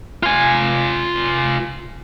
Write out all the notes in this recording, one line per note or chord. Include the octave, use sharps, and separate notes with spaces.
F4 G#5